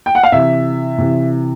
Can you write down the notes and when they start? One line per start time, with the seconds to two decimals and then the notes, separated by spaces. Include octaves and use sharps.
0.06 G5
0.15 F#5
0.23 F5
0.32 C3 E3 E5
0.98 C3 E3